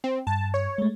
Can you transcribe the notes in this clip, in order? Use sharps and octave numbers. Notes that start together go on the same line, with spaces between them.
C4
G2 A5
C#5
G#3 A3